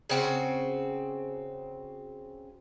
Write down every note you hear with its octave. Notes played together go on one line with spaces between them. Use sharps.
C#3 C4 F#4